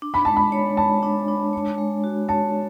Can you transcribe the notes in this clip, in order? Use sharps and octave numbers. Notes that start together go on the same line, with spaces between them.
D4
B5
G#3 A5
B5
C#5
G#3 A5
D4
D4
C#5
G#3
F#4
C#5 A5